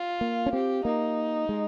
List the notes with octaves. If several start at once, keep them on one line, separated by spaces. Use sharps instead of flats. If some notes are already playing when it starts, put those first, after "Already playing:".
Already playing: F4
A#3
C#4
C4 G4
A#3 D#4
G#3